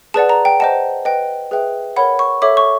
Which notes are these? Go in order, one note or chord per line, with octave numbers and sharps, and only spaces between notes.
G#4 B4 D5 F#5 A5
A#5
G5
C5 D#5 F#5 A5
B4 D#5 G5
G#4 B4 E5 G5
A#4 C#5 F#5 B5
C#6
A4 C#5 E5 D6
C#6